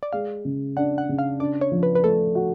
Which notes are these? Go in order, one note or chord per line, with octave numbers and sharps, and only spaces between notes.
D5
G#3 F5
C#3
D4 F#5
F#5
C#3
F5
D4 D5
C#5
F3
B4
B4
A3 A4
F#4